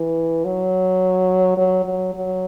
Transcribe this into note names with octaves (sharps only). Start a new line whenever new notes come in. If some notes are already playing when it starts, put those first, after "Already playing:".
Already playing: E3
F#3
F#3
F#3
F#3